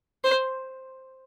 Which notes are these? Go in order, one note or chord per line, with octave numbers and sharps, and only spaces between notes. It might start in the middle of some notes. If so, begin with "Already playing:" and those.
C5